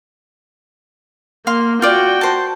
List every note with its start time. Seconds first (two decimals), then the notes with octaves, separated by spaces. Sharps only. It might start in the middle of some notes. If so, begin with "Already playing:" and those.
1.47 A#3 F5 C6
1.82 F4 F#4 D5 G5
2.21 C5 A5